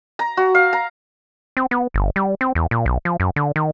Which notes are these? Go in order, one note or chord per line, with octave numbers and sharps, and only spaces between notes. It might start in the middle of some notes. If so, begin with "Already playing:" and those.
A#5
F#4
F5
A#5
C4
B3
G1
G3
C4
E2
A#2
B1
F3
F#2
D3
D#3